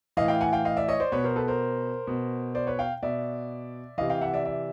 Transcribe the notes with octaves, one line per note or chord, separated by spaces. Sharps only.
A2 E3 D#5 F5
F5 G5
F#5 G#5
F5 G5
D#5 F5
D5 E5
C#5 D#5
C5 D5
B2 B4 C#5
A#4 C5
A4 B4
A#4 C5
B2
C5 D5
B4 C#5
F5 G5
B2 D5 E5
C3 E3 D#5 F5
F5 G5
E5 F#5
D5 E5
D5 E5